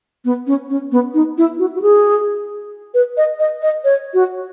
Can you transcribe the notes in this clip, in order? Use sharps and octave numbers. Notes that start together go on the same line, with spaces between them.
B3
C#4
C#4
B3
D#4
E4
F#4
F#4
G#4
B4
D#5
D#5
D#5
C#5
F#4